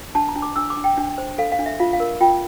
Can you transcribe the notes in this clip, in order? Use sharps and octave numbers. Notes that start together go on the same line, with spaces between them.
D4 A5
A#5
D4
D6
D4 E6
D6
D4
G5
D4
C5
A4 F5
F5
D4
E5
F4 F5
F5
A#4
F4 G5